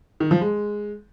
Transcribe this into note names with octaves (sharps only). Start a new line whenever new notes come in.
D#3
F3
G#3